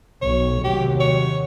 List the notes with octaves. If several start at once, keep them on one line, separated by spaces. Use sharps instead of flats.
B1 C#5
D#2 C3 F#3 G4
C#5